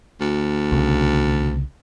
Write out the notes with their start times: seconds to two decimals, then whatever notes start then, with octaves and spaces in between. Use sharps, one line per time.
0.21 D2
0.72 C2 C#3